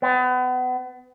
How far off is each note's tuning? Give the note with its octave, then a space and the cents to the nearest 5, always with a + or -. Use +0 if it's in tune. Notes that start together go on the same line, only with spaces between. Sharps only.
B3 +35